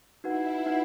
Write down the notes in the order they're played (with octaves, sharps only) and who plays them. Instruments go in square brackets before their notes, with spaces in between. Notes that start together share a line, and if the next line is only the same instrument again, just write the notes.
[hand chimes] D#4 F#4 B4 F#5 [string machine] E4
[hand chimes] D#4 F#4 B4 F#5